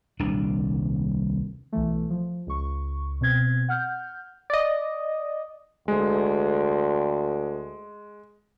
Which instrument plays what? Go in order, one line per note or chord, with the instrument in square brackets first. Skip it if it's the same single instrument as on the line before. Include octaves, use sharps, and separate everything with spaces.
[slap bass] D#1 C2 D4
[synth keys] B1 E3 A3
F3
C#2 C#6
B2 C4 G#6
F#5 F6 G6
D5 D#5
[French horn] D2 [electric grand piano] G#3